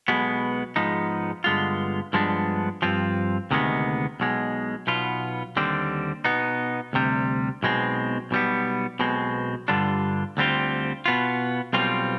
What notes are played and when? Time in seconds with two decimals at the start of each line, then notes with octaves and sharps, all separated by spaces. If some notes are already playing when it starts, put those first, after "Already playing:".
0.08 B1 B2 G#3 B3
0.76 G#2 F3 G#3 B3 D#4
1.44 G2 D3 G#3 B3 F4
2.13 G2 F3 G#3 B3 D4
2.82 G2 F3 C4 F4
3.51 D2 C3 D#3 G#3 B3
4.20 B1 B2 G#3
4.87 B1 B2 B3 F4
5.57 D#2 D3 G3 C4
6.24 B2 B3 D#4
6.93 D2 C3 G3
7.63 B1 B2 G#3 C4
8.31 B1 B2 G3 B3
8.99 B1 B2 G#3 C4
9.68 G2 D3 G3 D4 F4
10.37 D2 D3 G3 C4 F4
11.06 B2 B3 F4
11.73 B1 B2 G3 C4 F4